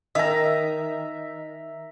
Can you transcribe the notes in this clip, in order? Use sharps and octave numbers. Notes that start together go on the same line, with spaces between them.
D#3 D#5 E5 A#5